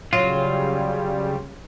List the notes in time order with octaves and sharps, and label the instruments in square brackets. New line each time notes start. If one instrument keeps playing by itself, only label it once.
[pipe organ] C#3 G3 [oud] F#3 [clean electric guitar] F4